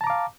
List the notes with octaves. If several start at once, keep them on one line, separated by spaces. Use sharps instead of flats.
F5 A5 A#5 D6